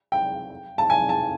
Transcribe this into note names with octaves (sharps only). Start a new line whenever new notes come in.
G5
A5
G#5
A5